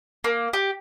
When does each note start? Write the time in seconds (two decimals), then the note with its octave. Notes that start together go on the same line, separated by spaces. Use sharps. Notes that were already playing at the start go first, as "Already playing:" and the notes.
0.24 A#3
0.53 G4